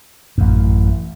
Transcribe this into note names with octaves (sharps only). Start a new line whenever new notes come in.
A1 F#2